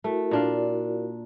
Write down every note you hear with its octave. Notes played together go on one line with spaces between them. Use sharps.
A3 E4 F#4 A#4
A#2 D4 F5